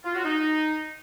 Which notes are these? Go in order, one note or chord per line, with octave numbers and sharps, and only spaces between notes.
F4
F#4
D#4